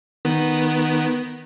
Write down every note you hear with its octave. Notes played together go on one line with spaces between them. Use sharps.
D#3 B3